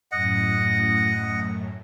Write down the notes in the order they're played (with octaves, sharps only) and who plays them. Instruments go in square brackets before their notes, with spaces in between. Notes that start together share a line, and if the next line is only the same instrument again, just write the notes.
[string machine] F#2 A2 [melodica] D#5 F#5